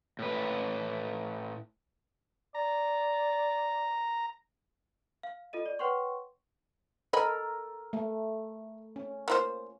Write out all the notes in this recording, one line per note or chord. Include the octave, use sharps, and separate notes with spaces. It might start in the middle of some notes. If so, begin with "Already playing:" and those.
A2 B4
D5 A#5
F5
F4 A4 D#5 D#7
D5
B4 C#5 F#5 G5 C6 C#6
A4 A#4 D#5 G#5 B5
A3
C#4
A#3 F4 C5